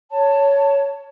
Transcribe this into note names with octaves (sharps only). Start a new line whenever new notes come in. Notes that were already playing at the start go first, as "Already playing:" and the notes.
C#5 A5